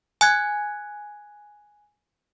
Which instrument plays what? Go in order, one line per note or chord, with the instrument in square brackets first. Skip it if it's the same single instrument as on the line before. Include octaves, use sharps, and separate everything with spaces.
[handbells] G#5 F#6 G#6